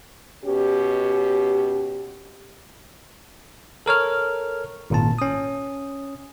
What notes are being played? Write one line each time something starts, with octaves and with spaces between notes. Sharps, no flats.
B2 C#4 G4
A4 A#4 C#5 F6
G#1 A#2 A5
C#4 D#6